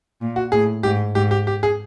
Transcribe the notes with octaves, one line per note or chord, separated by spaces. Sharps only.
A#2
F#4
A2 G#4
G#2 G4
G#2 G4
G4
G4
G#4